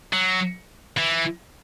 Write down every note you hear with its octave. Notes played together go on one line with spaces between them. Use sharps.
F#3
E3